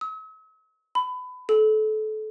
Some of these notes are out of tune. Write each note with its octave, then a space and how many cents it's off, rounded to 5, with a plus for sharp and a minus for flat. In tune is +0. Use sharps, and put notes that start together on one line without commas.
E6 -45
B5 +25
A4 -30